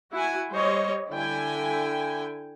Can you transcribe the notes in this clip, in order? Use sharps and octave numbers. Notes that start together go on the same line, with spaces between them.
E4 F#4 F#5 G#5
G3 C5 C#5 D#5
D3 E4 G5 G#5